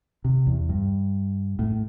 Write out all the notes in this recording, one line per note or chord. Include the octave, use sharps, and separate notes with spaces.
C3
E2
G2
A2